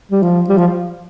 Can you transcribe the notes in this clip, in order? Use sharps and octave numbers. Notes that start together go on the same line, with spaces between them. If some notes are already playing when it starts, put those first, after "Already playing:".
G3
F3
G3
F3